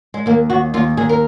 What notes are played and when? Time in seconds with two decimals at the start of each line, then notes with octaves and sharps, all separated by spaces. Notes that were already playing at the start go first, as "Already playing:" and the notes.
0.14 G#3
0.26 D#2 A#3
0.50 D#2 F#4
0.74 D#2 F4
0.97 D#2 G#4
1.09 A#4